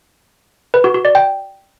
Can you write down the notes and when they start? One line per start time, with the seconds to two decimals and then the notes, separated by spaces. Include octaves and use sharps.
0.74 B4
0.84 F#4
0.94 F#4
1.05 D5
1.15 G5